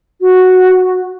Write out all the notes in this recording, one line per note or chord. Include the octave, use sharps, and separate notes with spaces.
F#4